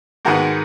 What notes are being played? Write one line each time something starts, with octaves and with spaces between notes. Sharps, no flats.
G#2 D#3 G#3 B3 F#4 A#4